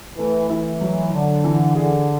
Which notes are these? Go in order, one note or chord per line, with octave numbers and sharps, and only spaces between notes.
E3 A3
E3 E4
F#3
D3 D4
E3
D3 G#4